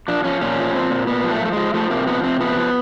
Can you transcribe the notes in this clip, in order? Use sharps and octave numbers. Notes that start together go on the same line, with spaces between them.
F3 D4
F3 C#4
A#2 C#4
F3
A#2 C4
A#2
A#2 B3
F3
A3
F3 A3
F3 G#3
F3 A3
C3 A#3
F3 B3
C3 C4
F3 B3
F3